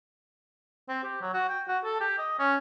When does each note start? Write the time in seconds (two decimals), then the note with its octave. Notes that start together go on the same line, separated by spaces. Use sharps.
0.89 C4
1.04 G4
1.22 F#3
1.34 F#4
1.49 G5
1.68 F#4
1.84 A4
2.01 G4
2.19 D#5
2.39 C#4